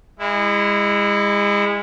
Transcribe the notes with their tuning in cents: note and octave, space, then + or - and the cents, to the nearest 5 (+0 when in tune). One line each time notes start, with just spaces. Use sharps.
G#3 -30 E4 +0